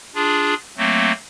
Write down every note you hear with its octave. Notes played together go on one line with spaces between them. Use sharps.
D4 F4 G#4
F#3 A3 A#3 C4